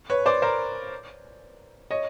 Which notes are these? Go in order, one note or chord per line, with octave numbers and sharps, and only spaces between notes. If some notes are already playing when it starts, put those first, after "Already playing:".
B4 C#5
C5 D5
A#4 C5
C#5 D#5